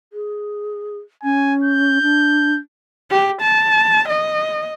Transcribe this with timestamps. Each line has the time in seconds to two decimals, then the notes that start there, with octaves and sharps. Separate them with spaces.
0.13 G#4
1.23 C#4 G#5
1.64 G6
2.02 D4
3.10 G4
3.41 A5
4.08 D#5